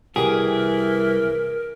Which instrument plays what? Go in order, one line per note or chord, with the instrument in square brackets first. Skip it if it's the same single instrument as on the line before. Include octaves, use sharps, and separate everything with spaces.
[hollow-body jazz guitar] C2 G4 [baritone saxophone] E3 [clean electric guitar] G#4 [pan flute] A#4